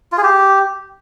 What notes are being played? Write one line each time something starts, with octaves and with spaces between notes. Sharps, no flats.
F4
G#4
G4